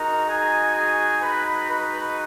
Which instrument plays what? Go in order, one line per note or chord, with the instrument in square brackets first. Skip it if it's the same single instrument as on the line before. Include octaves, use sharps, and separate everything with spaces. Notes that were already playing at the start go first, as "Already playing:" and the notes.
Already playing: [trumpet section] G#3 D#4 F#4 A#4 A#5
G#4 G#5
G#4 G#5
B4 B5
B4 B5